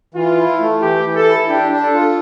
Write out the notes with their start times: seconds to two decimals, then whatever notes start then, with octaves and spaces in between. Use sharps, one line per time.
0.14 E3 F4
0.37 E4
0.60 A3
0.82 E3 G4
1.04 E3
1.15 A4
1.27 E4
1.49 D4 G4
1.71 D4
1.82 A4
1.93 F4